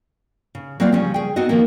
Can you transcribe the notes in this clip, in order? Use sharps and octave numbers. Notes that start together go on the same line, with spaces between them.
C#3
F#3 A#3 C4 F4 D5
C#3 F3 G3 C#4
G#4 G5
B3 C4 D#4 F#4 D#5
D#3 F3 A#3